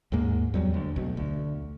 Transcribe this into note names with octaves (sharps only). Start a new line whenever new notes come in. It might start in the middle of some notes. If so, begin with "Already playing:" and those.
D#2 G#2 G#3 A#3
E2 F#3 G3
D2
B1
D2